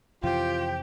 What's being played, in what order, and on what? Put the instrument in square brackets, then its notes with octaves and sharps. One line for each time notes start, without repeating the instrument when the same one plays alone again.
[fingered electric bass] F2 C3 E3 [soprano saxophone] F4 [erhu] G4 [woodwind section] C5 G5